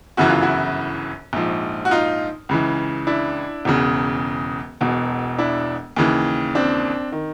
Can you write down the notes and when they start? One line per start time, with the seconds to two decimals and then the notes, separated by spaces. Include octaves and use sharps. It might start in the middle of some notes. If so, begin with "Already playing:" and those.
0.17 G1 F#2 C#3 E3 F#4
0.29 F4
0.42 E4 F#4
1.33 A#1 G#2 F3
1.85 F#4
1.91 D#4 F4
2.49 C#2 C#3 E3
3.07 D4 E4
3.65 E1 E2 C#3
4.81 E1 E2 B2
5.39 D4 E4
5.96 D#2 C#3 E3
6.55 C4 D4
7.12 D#3